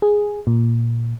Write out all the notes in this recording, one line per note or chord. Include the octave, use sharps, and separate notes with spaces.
G#4
A#2